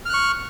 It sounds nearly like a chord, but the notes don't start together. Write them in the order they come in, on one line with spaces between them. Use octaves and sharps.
F6 F#6 C#6